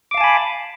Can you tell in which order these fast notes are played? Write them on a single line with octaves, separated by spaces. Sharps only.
D6 F5 A5 G#5 B5